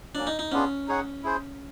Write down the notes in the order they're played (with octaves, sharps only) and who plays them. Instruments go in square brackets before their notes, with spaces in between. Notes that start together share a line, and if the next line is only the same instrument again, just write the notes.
[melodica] F#3 A#3 C#4 [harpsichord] D4
[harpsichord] D#4
D#4
[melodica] B3 D4 F4 G#4 [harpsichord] C#4
[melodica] D#4 G#4 C#5 F#5
E4 G#4 C5